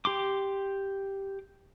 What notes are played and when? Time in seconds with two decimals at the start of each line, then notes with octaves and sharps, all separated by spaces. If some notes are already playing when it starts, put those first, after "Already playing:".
0.05 G4 C6 D6